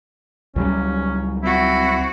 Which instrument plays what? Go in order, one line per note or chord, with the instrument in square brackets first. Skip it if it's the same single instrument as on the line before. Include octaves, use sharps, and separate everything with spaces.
[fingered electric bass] C#2 F#3 G3 [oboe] C#4
[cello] C4 F#4 [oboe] E4